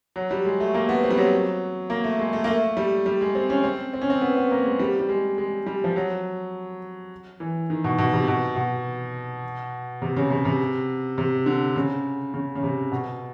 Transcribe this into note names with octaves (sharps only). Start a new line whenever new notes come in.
F#3
G3
G#3
A3
A#3
B3
C4
G3
F#3
A#3
A3
G#3
A3
A#3
A3
G3
G3
G#3
C4
C#4
C4
C4
C#4
C4
B3
B3
A#3
G#3
G3
G3
G#3
G#3
G3
F3
F#3
E3
D#3
B2
B2
C3
B2
B2
C3
C#3
C3
C3
C3
D3
C#3
C#3
C#3
C3
B2